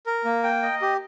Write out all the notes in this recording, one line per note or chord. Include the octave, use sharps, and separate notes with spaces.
A#4
A#3
G5
D#5
G4